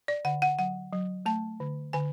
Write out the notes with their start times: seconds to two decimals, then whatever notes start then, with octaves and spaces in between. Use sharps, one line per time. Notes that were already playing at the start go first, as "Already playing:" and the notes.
0.08 D5
0.25 D3 F#5
0.42 F#5
0.59 F#3 F#5
0.93 F#3
1.26 A3 A5
1.60 D3
1.93 D3 G#5